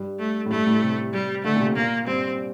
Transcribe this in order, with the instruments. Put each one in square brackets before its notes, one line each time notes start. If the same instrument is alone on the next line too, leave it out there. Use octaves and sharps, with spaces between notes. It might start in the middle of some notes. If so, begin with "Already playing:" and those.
Already playing: [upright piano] G2
[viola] A3
[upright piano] A2
[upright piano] G2 [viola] A3
[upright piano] A2
C3
[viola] G3
[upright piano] D3 [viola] A3
[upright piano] A#2
C3
[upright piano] A#2 [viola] A#3
[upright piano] G2 [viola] C4